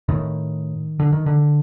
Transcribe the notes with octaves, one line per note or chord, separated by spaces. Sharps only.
A2 D#3
D3
D#3
D3